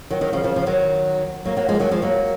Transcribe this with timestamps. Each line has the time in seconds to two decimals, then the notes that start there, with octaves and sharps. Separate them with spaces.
0.10 D#3 F#3
0.21 D#3 F#3
0.33 C#3 F3
0.44 C#3 F3
0.56 C#3 F3
0.66 D#3 F#3
1.45 F#3 A#3
1.57 F#3 A#3
1.68 F3 G#3
1.80 D#3 F#3
1.91 F3 G#3
2.02 F#3 A#3